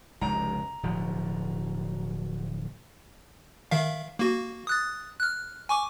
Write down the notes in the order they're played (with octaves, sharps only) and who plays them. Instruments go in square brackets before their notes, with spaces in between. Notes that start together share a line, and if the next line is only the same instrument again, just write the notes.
[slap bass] F1 C#2 C3 [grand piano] A#5
[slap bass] D1 B2 F3
[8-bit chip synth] D#3 E5 F5
A#3 F#4
D#6 F#6 A6
F6 F#6
G#5 C#6 D6